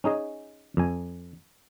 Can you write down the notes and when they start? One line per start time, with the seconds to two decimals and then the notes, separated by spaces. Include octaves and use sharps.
0.04 C#4 D#4 G#4 D#5
0.77 F2 G#5